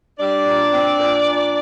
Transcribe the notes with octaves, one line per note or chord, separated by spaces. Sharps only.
G3 D4 D5
A#2
C4
A#2
A#2